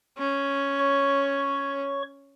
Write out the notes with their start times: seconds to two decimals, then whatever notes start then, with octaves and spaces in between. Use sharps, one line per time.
0.18 C#4
0.79 C#5 C#6